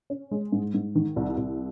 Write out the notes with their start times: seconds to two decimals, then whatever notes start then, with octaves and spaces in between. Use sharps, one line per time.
0.10 C#4
0.31 G#3
0.52 G#2
0.74 G#2
0.95 D#3
1.16 C2
1.37 C2